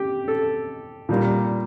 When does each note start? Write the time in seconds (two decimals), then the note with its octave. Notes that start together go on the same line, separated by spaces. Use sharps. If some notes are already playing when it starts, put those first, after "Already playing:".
Already playing: G4
0.28 A4
1.09 A#2 G3 A#3